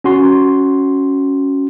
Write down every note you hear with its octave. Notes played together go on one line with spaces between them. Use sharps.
C#4 F#4 C6